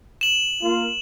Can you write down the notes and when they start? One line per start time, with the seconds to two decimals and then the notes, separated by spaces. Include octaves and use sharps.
0.21 E7 F#7
0.62 A#3 F4